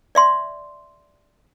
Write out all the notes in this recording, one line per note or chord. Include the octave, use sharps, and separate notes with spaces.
D5 E5 C6